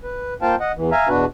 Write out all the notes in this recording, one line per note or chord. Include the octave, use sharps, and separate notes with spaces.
B4
A#3 F4 C5 F5 G5 A5
D#5 F#5
E2 E3
E5 F5 G#5 A#5
E2 B2 B3 D4 F#4 B4